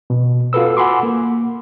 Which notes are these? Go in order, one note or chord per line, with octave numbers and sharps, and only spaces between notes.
B2
F4 F#4 A4 B4 E6
F#5 G#5 B5 C6 D6
A#3